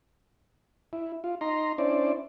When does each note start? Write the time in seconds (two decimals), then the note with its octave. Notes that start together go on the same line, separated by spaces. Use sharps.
0.93 E4
1.24 F4
1.41 D#4 A#5 C6
1.78 C#4 D4 E4 C5 D5